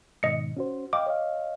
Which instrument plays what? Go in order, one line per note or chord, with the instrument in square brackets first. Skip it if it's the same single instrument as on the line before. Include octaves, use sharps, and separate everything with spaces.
[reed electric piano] G#2 B2 D#3 [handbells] D#5 C#7
[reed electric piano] C#4 F#4 C5
[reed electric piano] D#5 F5 G5 [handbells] D6
[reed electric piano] C#5 D#5 F5